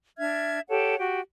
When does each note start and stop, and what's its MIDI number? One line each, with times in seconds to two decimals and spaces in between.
0.17 0.59 62
0.17 0.59 76
0.17 0.59 89
0.17 0.59 92
0.69 0.96 67
0.69 0.96 69
0.69 0.96 73
0.69 0.96 78
0.98 1.20 66
0.98 1.20 67